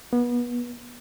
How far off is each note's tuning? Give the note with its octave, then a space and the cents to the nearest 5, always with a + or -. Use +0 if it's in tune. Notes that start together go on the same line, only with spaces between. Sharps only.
B3 -30